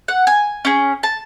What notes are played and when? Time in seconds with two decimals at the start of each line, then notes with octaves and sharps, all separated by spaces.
0.08 F#5
0.27 G#5
0.65 C#4 G#4
1.03 A5